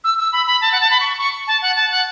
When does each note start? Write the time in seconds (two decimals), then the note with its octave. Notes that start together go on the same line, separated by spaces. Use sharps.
0.04 E6
0.18 E6
0.33 B5
0.46 B5
0.61 A5
0.72 F#5
0.81 A5
0.91 B5
1.00 C#6
1.18 C#6
1.47 A5
1.62 F#5
1.76 A5
1.91 F#5